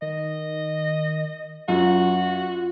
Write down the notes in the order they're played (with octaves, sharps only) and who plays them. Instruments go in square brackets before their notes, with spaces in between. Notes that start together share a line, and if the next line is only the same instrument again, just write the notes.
[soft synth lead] D#3 [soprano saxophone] D#5
[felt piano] F#2 [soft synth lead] F4 [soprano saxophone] F#4